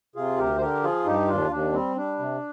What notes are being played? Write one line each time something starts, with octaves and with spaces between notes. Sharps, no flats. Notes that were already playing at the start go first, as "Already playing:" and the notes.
C3 F4 G#4
D2 G4 A#4
C5
D3 G4 A#4
F3 F4 G#4
G2 D#4 G4
D#2 D4 F4
D#2 D4
G3 C4
G3 D4
C3